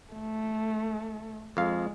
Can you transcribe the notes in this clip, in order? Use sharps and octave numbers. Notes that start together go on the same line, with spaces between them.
A3
F2 G#3 F5